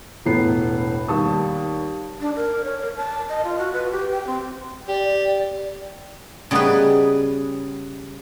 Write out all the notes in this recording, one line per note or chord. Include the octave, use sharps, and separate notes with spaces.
E1 A2 B3 C7
D#2 G3 A5 C#6 D#6
D4
A#4
C#5
A#4
A5
D#5
F4
F#4
B4
G4
G5
C4
G4 D5
C#3 G3 B3 D#4 G#4 B4